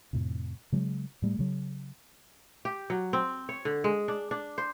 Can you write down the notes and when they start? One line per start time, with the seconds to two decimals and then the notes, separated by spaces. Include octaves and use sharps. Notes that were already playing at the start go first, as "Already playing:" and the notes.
0.13 F2 A2 C3
0.72 C#3 F#3 G#3
1.22 A2 G3 A3
1.39 C#3 F#3
2.65 G4
2.90 F#3
3.13 C4
3.49 C#5
3.65 D3
3.84 G#3
4.08 D4
4.31 D4
4.58 C5